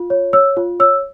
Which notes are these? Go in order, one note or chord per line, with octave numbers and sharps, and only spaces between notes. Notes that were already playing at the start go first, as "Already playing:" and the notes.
Already playing: F4
C#5
C#5 E6
F4
C#5 E6